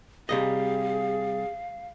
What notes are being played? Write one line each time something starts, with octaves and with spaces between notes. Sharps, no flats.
C3 G3 G#4 D#5 F5